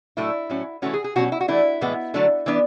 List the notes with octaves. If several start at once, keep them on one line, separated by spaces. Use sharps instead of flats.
A2 F#3 A3 D4 E4
A2 F#3 C#4
E3 A3 C#4 F#4
G#4
G#4
B2 F#3 C#4 F#4
E4
F#4
E3 A3 D4 E4
A2 E3 G#3 B3
D3 F#3 A3 D4
E3 B3 D4